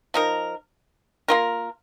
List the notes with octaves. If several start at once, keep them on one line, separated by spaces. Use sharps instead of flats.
F3 D#4 A#4
A#3 F4 A#4